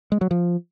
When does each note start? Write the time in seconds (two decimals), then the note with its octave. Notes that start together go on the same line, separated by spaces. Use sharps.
0.12 G#3
0.21 F#3
0.31 F3